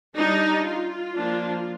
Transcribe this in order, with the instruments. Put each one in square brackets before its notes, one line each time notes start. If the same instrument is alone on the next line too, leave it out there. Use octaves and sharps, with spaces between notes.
[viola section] G3 D4 D#4
F4
F3 A#3 D4